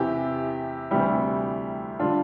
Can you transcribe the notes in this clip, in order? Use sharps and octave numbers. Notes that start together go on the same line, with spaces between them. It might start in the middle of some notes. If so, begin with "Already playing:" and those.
Already playing: E2 C3 E3 E4 G4
D2 C3 E3 G3 E4 G4
D3 G3 D4 F4